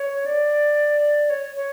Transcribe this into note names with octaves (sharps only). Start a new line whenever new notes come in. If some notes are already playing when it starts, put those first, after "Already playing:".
Already playing: C#5
D5
C#5
C#5